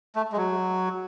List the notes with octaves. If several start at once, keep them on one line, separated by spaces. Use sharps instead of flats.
A3
G#3
F#3